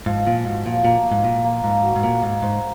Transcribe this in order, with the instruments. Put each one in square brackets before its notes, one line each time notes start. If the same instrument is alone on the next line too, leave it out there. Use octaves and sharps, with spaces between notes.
[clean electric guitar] G#2 [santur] F3
[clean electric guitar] A#2 [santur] F3
[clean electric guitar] G#2 [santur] F#4
[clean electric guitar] A#2 [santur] F3
[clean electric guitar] A#2 [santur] A#3
[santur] A#3
[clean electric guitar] G#2
[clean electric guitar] A#2 [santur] F4
[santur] A#3
[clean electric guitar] G#2 [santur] A#3
[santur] F#4
[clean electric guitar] G#2
[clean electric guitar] A#2 [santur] A#3
[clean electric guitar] G#2 [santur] A#3
[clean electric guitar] G#2 [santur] C5